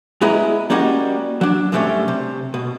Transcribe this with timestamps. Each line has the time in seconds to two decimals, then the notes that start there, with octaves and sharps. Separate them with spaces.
0.21 G#3 B3 E4 G#4 D#5 A#5
0.70 G3 A#3 C#4 F#4 G4 D#5
1.41 F#3 D4
1.72 F#2 C3 G3 A3 C#4
2.08 C3
2.54 B2